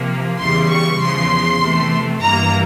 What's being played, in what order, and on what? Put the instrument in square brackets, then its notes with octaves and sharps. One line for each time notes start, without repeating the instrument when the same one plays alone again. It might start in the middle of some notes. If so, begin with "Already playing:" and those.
Already playing: [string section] C3 F3 A#3
E2 C#3 E3 G3 C6
C#6
E2 C#3 F3 C6
C3 E3 A3
G2 E3 G3 A#3 A#5